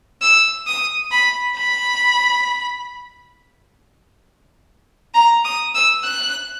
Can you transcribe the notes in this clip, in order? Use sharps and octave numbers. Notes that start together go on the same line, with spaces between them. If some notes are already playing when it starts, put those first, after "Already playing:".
E6
D#6
B5
B5
A#5
D#6
E6
F#6